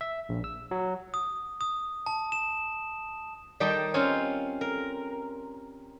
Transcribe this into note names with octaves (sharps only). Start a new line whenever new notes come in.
E5
A#1
E6
F#3
D#6
D#6
A5
E7
D#3 G3 D5 D#5 G5 A5
C4 C#4 F4 C#5 F5
A#4